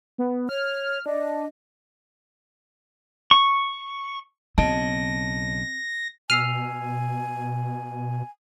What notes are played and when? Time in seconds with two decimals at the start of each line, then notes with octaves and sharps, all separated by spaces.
0.18 B3
0.49 C#5 F6
1.06 D4 D#5
3.31 C#6
4.58 B1 C#3 C4 D#5 A5 A#6
6.30 B2 G#5 E6 F6 C7 D#7